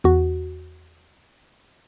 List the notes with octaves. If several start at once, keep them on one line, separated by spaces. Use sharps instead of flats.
E2 F#4